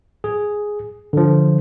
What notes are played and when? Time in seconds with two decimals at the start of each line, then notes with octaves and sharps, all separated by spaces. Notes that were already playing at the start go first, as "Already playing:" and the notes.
0.24 G#4
1.13 D3 F3